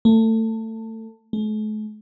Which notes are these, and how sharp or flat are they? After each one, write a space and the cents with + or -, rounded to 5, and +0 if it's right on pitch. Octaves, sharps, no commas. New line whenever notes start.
A3 +25
A3 -45